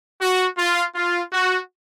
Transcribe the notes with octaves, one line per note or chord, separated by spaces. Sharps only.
F#4
F4
F4
F#4